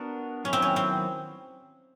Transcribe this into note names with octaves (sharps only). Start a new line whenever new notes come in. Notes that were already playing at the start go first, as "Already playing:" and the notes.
Already playing: B3 D4 F#4 A#4
D#3 F#3 B3 C#4 E4
C4
C#4
C4